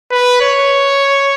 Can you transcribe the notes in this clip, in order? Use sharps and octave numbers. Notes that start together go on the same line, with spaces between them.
B4
C#5